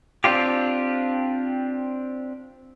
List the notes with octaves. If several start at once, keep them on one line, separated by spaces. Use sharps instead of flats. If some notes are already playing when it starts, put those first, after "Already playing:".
C4 D4 F4 G4